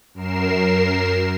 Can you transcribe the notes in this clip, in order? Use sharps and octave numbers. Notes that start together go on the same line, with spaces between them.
F#2 A#4 C7 E7